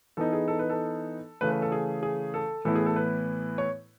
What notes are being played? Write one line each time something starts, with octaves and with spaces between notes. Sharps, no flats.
E3 B3 D#4 A4
G#4
A4
B4
A4
C#3 E3 A3 B4
B4
A4
G#4
G#4
A4
A2 E3 B3 E4 A4
G#4
A4
B4
C#5